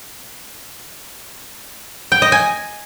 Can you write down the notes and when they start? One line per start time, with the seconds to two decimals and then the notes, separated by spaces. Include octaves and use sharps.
2.12 G5
2.22 D#5
2.32 G#5